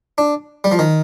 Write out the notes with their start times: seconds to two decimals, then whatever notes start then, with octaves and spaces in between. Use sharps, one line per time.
0.18 D4
0.64 G3
0.72 F3
0.79 D#3